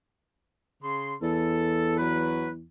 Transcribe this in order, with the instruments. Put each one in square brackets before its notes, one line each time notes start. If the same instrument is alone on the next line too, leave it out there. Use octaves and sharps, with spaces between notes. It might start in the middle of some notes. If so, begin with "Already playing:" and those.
[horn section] C#3 C6
[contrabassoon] E2 [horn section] A4
[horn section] F#3 F#4 B4